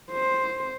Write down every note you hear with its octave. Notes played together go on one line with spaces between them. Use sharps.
C5